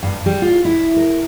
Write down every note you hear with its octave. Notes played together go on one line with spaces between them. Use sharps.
G2
G3
F4
E4
A#4